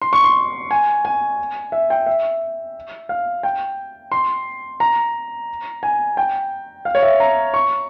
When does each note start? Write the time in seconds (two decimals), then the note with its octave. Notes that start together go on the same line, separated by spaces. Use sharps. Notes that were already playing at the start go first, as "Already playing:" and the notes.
0.02 C6
0.13 C#6
0.24 C6
0.71 G#5
1.05 G#5
1.72 E5
1.90 G5
2.06 E5
3.09 F5
3.43 G5
4.12 C6
4.80 A#5
5.83 G#5
6.17 G5
6.85 F5
6.95 C#5
7.03 E5
7.20 A#5
7.54 C#6